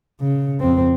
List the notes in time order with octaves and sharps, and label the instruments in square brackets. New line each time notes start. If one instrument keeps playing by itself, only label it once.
[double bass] C#3
F2 C4